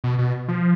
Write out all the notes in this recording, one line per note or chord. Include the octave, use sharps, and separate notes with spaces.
B2
B2
F3